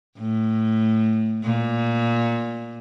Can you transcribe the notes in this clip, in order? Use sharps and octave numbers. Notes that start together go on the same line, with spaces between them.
A2
A#2